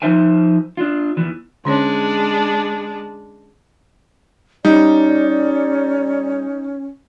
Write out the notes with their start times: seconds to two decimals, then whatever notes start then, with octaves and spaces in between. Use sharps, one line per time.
0.02 F3 A#3 D#4 C5 E5 G#5
0.77 D4 F4
1.17 E2 A2 E3
1.65 D3 G#3 C#4 D4 C#5
4.65 G3 C#4 D#4 D5